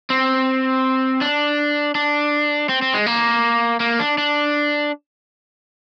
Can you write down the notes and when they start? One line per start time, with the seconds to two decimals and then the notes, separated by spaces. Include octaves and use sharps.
0.10 C4
1.21 D4
1.95 D4
2.69 C4
2.82 C4
2.94 G#3
3.06 A#3
3.80 A#3
3.99 D4
4.18 D4